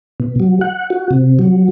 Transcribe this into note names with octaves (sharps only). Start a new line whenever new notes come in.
B2
F#3
F#5
F#4
C3
F#3